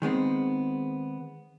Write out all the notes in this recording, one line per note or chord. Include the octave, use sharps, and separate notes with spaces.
D#3 G#3 B3 C4